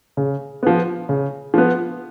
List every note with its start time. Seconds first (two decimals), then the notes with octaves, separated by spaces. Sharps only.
0.17 C#3
0.63 F3 B3
1.09 C#3
1.54 F3 B3